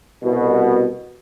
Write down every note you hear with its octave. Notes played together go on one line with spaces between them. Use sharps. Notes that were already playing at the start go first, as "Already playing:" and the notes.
C2 B2